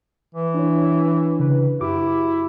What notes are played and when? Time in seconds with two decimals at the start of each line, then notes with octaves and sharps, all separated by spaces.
0.34 E3
0.54 D4 E4 C#5
1.39 C#3 B4
1.81 F#2 E4 F#4 G4 D6